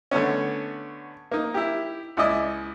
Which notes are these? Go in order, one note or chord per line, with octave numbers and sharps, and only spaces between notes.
D3 A3 B3 C#4
A#3 D#4
E4 G4
C#2 E4 D5 D#5